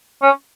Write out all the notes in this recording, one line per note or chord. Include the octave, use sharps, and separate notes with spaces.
C#4